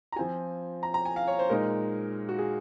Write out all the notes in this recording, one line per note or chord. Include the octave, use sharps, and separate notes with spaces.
A#5
F3 C4 F4 G#5
A#5
A#5
G#5
F5
C#5
C5
A#2 G#3 D#4 A#4
F#4
G#4